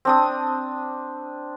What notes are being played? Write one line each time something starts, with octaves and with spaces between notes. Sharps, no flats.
C4 D4 D#6